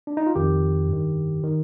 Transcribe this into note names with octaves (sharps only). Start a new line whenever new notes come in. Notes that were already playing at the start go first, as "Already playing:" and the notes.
D4
D#4
F4
F2 D#3 G4
G2 D#3
D#3